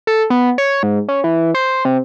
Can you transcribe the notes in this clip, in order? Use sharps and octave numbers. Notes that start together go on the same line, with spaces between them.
A4
B3
C#5
G#2
C#4
E3
C5
C3